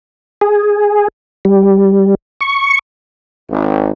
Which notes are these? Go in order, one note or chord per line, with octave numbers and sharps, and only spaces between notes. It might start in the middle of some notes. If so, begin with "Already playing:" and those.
G#4
G3
C#6
G#1